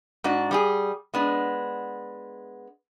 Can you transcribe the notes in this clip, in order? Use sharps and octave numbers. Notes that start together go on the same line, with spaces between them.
G#2 D4 F#4
G3 G4 G#4
G#3 B3 D4